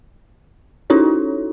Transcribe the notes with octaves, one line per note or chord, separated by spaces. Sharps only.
C#4 D#4 E4 F#4 A4 C#5